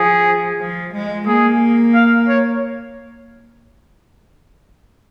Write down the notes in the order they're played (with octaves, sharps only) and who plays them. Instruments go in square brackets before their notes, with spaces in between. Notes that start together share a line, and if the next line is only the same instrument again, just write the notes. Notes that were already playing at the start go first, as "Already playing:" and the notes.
Already playing: [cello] F3 [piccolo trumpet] G#4
[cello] F3
G#3
[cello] A#3 [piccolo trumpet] G#4
[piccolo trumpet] F5
C#5